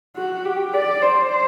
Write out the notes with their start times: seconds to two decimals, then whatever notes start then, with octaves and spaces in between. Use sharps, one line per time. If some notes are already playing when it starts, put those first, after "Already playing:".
0.17 F#4
0.45 G4
0.73 D5
1.01 C5